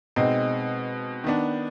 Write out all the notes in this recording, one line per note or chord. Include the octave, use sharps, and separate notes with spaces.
B2 G#3 C4 D#4
D#3 B3 D4